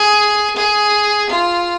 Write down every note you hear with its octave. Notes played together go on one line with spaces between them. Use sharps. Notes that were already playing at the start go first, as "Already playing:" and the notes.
Already playing: G#4
G#4
F4